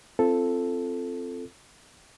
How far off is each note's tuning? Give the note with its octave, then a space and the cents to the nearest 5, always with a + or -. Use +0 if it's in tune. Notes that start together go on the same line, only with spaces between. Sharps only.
C4 +0 F4 -25 A4 +0